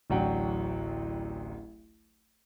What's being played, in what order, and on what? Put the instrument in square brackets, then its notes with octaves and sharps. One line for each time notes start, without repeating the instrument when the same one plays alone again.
[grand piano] D1 A1 F#3 D4 F#5 G5